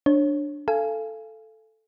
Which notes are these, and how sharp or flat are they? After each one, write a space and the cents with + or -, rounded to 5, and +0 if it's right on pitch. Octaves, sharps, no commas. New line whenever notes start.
D4 +0 C#5 -25
A4 +0 F5 -30 G#5 +0